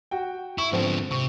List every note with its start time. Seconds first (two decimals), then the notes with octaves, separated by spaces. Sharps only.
0.11 F#4 G5
0.58 E4 C#6
0.72 G#2 D3 F3 B3 C4
1.11 C3 C#6